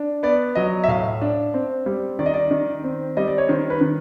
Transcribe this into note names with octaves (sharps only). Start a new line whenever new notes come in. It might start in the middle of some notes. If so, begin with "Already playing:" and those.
Already playing: D4
B3 D5
F#3 D#5
E5
A2 F5
D4
C4
G3
D#3 D5
D#5
D5
D#3
C4
G3 D#5
D5
C#5
D#3 C5
B4
D#3